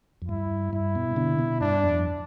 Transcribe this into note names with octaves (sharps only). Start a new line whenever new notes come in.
F2
G2 E4
G2 E4
B2
B2 D3
B2
G2 D4
F2